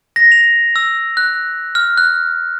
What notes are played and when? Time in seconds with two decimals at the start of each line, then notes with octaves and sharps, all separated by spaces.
0.16 A#6
0.32 F7
0.76 E6
1.17 F#6
1.75 F6
1.97 F#6